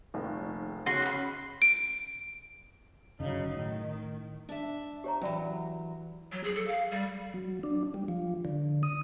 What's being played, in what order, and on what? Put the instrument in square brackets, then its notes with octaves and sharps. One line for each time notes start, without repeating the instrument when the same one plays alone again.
[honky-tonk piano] F1 A#1 D#3
[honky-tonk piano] C#3 C#4 [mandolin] F#4 C6
[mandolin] B5 C6
[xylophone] D7
[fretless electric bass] G1 C#3 [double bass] F#3 D#4
[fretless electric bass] A2 [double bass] D#3
[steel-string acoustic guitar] D4 E5
[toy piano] G4 C#5 A#5
[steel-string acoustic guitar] E3 F#3 [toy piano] C#4 D5 B5
[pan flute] F#3
G#4
A4
F5
G3
[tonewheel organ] F#3
D4
G3
F3
D3
D#6